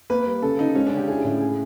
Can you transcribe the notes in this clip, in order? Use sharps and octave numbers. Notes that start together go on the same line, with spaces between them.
A#3 B4
G3
C#3 A4
C#3 D#4
G#3 C#4
D4
C#3 G4
E4 G#4
A2
G#4